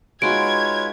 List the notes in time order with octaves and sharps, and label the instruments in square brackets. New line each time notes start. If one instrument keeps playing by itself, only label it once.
[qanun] G#3 D#4 F#4 [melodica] F4 B4 C#5 [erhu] G#6 [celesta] D7